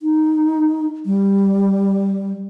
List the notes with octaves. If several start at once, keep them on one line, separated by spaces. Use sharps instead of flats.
D#4
G3